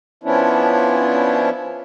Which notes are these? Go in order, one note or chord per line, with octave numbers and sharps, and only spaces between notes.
F3 B3 C#4 D4 E4